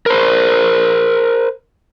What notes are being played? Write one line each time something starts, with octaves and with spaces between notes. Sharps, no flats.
A#4 C5